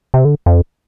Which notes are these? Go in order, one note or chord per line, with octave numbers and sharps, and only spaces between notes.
C3
D3
F2